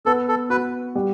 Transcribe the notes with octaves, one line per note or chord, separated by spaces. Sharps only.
B3 A4
A4
F#4 B4
G3